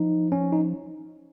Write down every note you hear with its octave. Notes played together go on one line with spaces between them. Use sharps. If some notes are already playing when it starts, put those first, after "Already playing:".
Already playing: F3 D#4
C#4
D#4